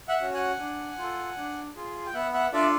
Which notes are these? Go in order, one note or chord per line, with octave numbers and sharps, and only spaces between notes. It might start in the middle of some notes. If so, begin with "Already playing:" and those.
E5 F#5
C#4 F#4
F#5 G#5
D4
F4 A4
D4
F4 G#4
G5
B3 E5 F#5
E5 F#5
D4 F4 A4 D5 E5